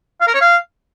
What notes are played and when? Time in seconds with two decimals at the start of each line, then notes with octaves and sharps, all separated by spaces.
0.21 F5
0.27 A#4
0.34 C#5
0.41 F5